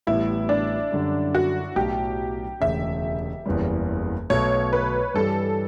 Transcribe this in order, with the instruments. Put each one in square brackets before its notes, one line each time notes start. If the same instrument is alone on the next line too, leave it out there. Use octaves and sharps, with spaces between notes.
[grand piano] A1 A2 G3 B3 [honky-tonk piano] E4
[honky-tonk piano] D4
[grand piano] F#2 D3 G3 D4
[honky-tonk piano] F#4
[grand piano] B1 A2 F#3 [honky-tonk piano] G4
[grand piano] E1 D2 C#3 [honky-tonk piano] E5
[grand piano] F#1 E2 C#3 E3 G3
[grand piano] B1 B2 A3 [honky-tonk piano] C#5
[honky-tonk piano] B4
[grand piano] G2 E3 G3 [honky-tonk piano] A4